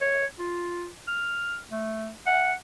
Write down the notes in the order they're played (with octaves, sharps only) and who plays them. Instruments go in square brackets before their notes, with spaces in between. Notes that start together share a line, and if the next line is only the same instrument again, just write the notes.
[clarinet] C#5
F4
F6
A3
F#5